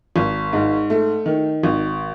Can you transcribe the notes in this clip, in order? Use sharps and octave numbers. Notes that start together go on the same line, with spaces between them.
G#1
G#2
A3
D#3
G#1